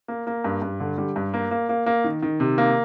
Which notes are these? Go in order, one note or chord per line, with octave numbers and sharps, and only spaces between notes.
A#3
A#3
G2
G2
D3
G3
G2
A#3
A#3
A#3
A#3
D#3
D#3
C3
A#3